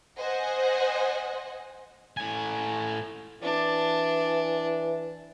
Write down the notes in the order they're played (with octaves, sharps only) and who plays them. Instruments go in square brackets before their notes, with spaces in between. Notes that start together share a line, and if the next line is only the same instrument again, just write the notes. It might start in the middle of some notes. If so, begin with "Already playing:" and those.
[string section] C5 D#5 F#5 G#5
[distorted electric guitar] A2 G#5
[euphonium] E3 [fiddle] D4